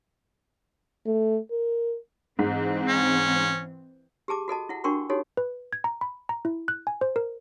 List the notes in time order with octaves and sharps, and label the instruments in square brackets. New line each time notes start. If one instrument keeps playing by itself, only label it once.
[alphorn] A3
A#4
[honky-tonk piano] G#2 [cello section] E3 C4
[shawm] C#4
[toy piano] G4 G#4 A5 D6
F#4 A4 D#5 A5
E4 F#5
D4 F#4 A#4 G5 C6 C#6
D#4 F#4 G4 A4 C#5
[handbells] B4
G#6
A#5
B5
A#5
E4
F#6
G#5
C5
A#4